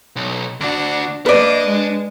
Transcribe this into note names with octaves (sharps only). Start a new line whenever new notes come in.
B1
D2 D4 F#4
A#3 D4 B4 D5 D#5
G#3